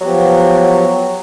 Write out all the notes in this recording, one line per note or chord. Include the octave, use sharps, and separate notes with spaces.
F3 F#3 B3 G4